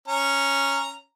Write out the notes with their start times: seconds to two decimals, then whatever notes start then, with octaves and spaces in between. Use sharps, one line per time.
0.08 C#4 A#5